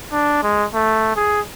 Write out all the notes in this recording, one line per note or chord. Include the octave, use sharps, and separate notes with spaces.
D4
G#3
A3
G#4